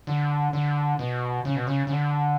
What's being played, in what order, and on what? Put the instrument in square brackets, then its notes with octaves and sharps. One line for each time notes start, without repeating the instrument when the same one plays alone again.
[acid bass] D3
D3
B2
C#3
B2
C#3
C#3
D3